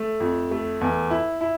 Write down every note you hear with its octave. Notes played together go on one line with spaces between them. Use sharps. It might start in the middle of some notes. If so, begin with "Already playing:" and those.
Already playing: A3
F2
A3
E2
E4
E4